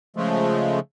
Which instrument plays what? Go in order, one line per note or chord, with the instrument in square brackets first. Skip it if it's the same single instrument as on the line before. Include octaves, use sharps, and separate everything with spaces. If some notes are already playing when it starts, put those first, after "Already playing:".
[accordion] C#3 F3 G#3 A3